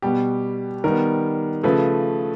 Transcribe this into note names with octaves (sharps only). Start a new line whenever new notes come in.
B2 G3 B3 G4
D#3 G3 B3 A#4
C#3 F3 A3 B4